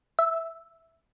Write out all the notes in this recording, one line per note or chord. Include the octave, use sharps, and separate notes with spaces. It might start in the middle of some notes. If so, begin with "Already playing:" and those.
E5